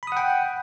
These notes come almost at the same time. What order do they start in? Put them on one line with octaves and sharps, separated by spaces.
B5 D#6 F#5 G5